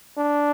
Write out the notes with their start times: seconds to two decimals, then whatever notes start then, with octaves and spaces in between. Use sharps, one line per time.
0.18 D4